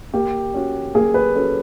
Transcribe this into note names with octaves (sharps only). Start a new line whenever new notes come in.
A#3 G4
C#4 F#4
A#3 G#4
B4
C#4 F#4 A4